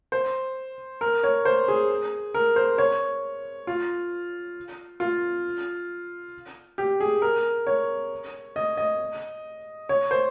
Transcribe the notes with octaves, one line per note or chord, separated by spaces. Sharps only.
C5
A#4
C#5
C5
G#4
A#4
C5
C#5
F4
F4
G4
G#4
A#4
C#5
D#5
D#5
C#5
C5